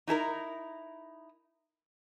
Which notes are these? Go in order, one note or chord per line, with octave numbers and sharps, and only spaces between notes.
D#4 E4 A4 A#4